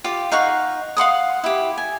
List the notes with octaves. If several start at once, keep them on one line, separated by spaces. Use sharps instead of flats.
F4 G4 F5
D#4 F5 F#5 C#6
F5 F#5 C6 D#6
E4 G4
G#5